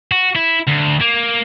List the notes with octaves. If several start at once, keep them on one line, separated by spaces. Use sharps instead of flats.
F#4
E4
D2
A#3